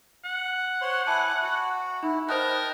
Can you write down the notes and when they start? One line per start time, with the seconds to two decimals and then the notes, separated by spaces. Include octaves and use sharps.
0.24 F#5
0.81 C5 C#5 C6
1.07 E4 G#5 A5 D6
1.43 F#4
2.03 D#4 E4
2.29 A#4 C5 D#5 G5 A5 D#6 F#6